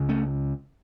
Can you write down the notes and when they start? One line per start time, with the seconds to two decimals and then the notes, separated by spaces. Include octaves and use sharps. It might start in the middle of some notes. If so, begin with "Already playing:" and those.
Already playing: C#2 C#3
0.09 A3 C#4